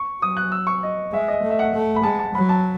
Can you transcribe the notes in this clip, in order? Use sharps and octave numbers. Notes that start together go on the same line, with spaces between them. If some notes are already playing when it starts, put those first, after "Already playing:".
Already playing: C#6
F#3 D#6
F#6
E6
C#6
D#5
G#3 E5
D#5
A3
E5
F#5
A3
B5
G#3 A5
A5
F#3 B5
A5